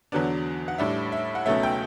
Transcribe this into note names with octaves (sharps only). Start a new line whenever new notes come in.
E2 D3 F#3 B3 D4
F#5
A2 G3 D4 E5
E5
F#5
C#2 B2 F#3 A3 C#4 E5
G5